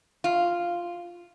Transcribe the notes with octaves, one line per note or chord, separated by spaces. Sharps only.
F4